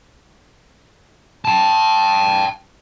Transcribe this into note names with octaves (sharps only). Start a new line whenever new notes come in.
G5 A5